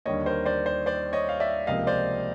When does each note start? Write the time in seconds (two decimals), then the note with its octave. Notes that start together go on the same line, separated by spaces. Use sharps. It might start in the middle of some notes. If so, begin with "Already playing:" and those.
0.06 D#2 D3 G3 A#3 C#5 D#5
0.26 A#4 C5
0.46 C5 D5
0.66 C5 D5
0.86 C5 D5
1.13 C#5 D#5
1.29 F5
1.40 D5 E5
1.67 C#2 C3 F3 A#3 D#5 F5
1.87 C5 D5